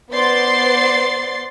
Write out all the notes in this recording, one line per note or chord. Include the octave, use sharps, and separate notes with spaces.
B3 C5 D5 C6 A6 C7